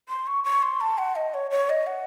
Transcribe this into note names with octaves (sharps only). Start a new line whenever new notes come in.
C6
C#6
C#6
C6
A5
F#5
D#5
C#5
C#5
D#5
F#5